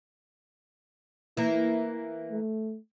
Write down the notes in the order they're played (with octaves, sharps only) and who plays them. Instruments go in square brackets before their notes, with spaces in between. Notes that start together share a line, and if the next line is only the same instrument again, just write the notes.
[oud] E3 A#3 [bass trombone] E4
[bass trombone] A3